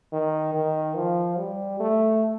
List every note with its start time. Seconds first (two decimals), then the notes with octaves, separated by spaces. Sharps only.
0.13 D#3
0.54 D#3
0.96 F3
1.38 G3
1.80 A3